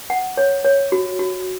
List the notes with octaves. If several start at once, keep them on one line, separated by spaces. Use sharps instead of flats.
F#5
C#5
C#5
F#4
F#4